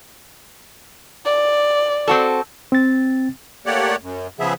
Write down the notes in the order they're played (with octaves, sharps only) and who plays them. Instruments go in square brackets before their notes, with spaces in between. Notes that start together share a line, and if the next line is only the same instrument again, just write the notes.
[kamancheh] D5
[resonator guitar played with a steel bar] C4 F#4 A4
[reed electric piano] C4 A6
[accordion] A3 A#3 G4 C#5 D5 F#5
F#2
C#3 F3 B3 G#4 E5